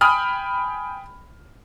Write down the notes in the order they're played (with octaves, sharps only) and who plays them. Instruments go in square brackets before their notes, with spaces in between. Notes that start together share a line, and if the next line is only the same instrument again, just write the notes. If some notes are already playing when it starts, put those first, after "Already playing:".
[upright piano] G5 G#5 B5 D#6 F6